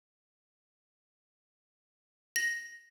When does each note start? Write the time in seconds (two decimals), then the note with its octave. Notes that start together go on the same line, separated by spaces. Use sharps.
2.36 A#6